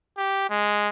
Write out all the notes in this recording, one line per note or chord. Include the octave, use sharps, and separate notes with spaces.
G4
G#3